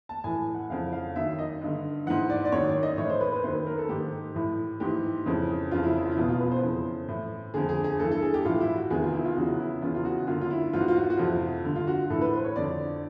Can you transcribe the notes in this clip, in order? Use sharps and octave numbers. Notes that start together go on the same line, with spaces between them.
A5
A2 E3 G#5
F#5
F2 C#3 E3 F5
F5
F#2 D#3 E5
D#5
G2 D3
G#2 E3 F#5
D5
D5
F#2 D#3 C#5
D5
D#5
A2 E3 C#5
C5
B4
B4
F#2 D#3 C5
B4
A#4
A4
G#2 D#3 G4
A2 E3
G#2 E3 G4
F2 C#3 E3
F2 C#3 E3 F4
E4
E4
F4
E4
E2 B2 F4
F4
B4
C5
F2 C#3 E3
A2 E3
F2 D3 G#4
G#4
G#4
G2 E3 A4
A4
G#4
G4
A2 E3 F4
E4
F#4
E2 C3 D#3 G#4
F4
E4
F4
E2 C#3 E3 F#4
E4
E2 C#3 E3 F4
F4
F#4
F#2 D3 F4
F4
E4
G#2 E3 F4
F#4
F4
F#4
F4
F#4
F2 C3 E3 F4
G2 D3
F4
F#4
A2 E3 A4
B4
C5
C#5
F2 D3 D5